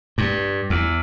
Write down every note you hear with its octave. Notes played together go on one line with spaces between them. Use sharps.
G2
E2